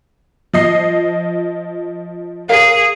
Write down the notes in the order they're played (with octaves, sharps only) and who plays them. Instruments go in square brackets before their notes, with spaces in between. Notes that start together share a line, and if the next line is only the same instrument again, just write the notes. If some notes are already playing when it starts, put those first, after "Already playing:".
[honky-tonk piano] F3 D#5 C7
[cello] G#4 [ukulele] A#4 C#5 F5